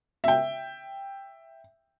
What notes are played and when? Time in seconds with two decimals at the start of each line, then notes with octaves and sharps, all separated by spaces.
0.24 E5 G5